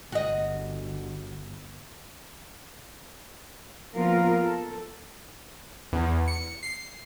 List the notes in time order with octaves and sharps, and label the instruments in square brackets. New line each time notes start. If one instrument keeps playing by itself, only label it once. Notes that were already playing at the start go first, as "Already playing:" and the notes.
[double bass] G1 [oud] F#4 D#5
[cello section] F3 A#3 B3 F4 A#4 F5
A4
[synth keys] E2
C#7
C7